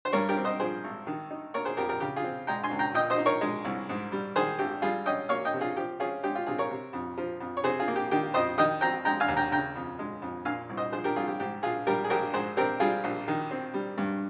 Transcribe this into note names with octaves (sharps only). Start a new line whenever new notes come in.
C5
G2 A#4 C#5
G4 A#4
C4
C5 D#5
F3 G#4 C5
G#1
D#3
D#4
A#3 A#4 C#5
G#4 C5
F2 G4 A#4
G4 A#4
C#3 G4
F4 G#4
C4
G#3 G5 A#5
G#5 C6
C#2
G5 A#5
A#2 D#5 G5
C5 D#5
D#4
A#4 C#5
G#3
C2
G#2
G3
D#3 G#4 C5
G#1 G4
G3 F4 G#4
C#4 D#5 G5
A#3 C#5 F5
D#5 G5
C3
F4 G#4
F3 G4
C#4 F4 G#4
G#3 G4
F4
C3 F4 G#4
A#4 C#5
C3
F2
F3
F2
C#5
C3 G#4 C5
F4 G#4
A#3
G4
D#3 G4
F2 C5 D#5
D#3 D#5 G5
C4 G5 A#5
G#3 G5 A#5
F5 G#5
D#2
G5 A#5
C#3 G5 A#5
F2
G#3
F2
A#2 F5 G#5
C2
C5 D#5
F3 G#4 C5
G4 A#4
C2 F4 G#4
G4
G#2 G4
A#1 F4 G#4
G3 G4 A#4
G#4
A#1 G4 A#4
G#2 G#4 C5
C4 G4 A#4
G3 F4 G#4
A#1
D#3
C4
G3
G2